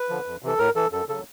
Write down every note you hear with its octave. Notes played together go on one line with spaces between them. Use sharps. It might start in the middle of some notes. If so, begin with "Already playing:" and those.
Already playing: B4
D3 F3
F2
C3 E3 A4
A2 A#4
E3 A4
F#2 A4
C#3 F#3 A4